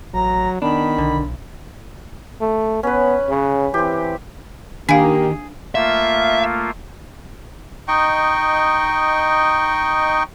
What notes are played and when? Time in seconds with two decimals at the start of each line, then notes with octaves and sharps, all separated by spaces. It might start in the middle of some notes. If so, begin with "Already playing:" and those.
0.14 A1 F#3 A#5
0.62 D#3 B3 D4 B5
0.98 B1 D3
2.41 A3
2.83 B3 C#4 B4
3.29 C#3
3.74 E3 C4 G4
4.89 D#3 A#3 D4 G4 G#4 F5
5.75 A3 A#3 F4 E5
7.88 D#4 D#5 G5 C#6